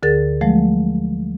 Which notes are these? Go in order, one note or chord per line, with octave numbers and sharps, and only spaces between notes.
D2 D3 G#4 A#4 A6
F3 F#3 G#3 A3